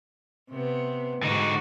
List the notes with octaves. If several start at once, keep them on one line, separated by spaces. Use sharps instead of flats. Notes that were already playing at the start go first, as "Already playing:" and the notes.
C3 B3
G#2 D3 D#4 F#4